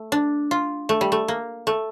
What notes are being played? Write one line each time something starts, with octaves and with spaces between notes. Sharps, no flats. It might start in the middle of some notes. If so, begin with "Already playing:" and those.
Already playing: A3
D4
F4
A3
G3
A3
A#3
A3